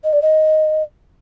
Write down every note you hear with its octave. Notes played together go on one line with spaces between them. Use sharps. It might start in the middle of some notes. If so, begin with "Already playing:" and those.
D#5
D5
D#5